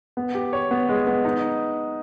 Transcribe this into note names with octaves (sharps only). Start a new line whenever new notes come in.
B3
G4
C#5
B3
G#3
B3
D#4